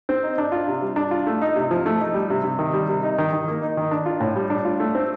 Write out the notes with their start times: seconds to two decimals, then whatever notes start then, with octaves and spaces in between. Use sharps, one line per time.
0.09 C4
0.23 D#4
0.38 D4
0.52 F4
0.68 C3
0.82 G3
0.96 D4
1.11 F4
1.27 A3
1.42 D#4
1.56 C3
1.71 F3
1.86 A3
2.00 D#4
2.14 G3
2.30 C3
2.44 C3
2.59 D#3
2.74 G3
2.89 C3
3.03 D#4
3.18 D#3
3.33 D#3
3.48 A#3
3.62 D#4
3.77 D#3
3.91 D4
4.06 F4
4.20 A2
4.36 G3
4.50 D4
4.65 F4
4.80 A3
4.95 C4